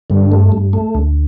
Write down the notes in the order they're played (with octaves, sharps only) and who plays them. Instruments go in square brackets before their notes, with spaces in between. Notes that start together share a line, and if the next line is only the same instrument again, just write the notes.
[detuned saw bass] G2 [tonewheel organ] D3
[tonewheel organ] A3
G2
A3
D2